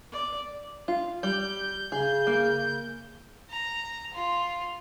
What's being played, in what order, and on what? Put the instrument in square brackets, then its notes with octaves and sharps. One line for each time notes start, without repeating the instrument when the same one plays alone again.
[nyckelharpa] D5
[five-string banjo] F4
[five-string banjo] G3 [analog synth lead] G6
[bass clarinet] C#3 [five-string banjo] G#4
[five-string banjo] A#3
[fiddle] A#5
F4